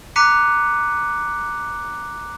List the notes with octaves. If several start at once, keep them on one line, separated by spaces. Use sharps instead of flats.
A#5 D6 F#6 B6 C#7 D#7